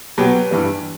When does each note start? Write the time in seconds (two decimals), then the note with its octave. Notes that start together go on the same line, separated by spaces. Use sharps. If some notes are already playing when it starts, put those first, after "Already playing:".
0.18 B2 F#3 G4 B4
0.51 G2 E3 G3